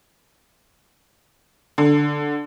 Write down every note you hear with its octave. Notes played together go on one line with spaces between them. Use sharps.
D3